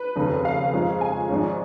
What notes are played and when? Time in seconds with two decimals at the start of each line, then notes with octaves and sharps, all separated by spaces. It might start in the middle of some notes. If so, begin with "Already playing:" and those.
Already playing: B4
0.16 F1 D#2 C#3
0.45 F5
0.72 G#2 F3 G#3 C#4
1.01 G#5
1.29 G#1 G#2 F3 G#3 C#4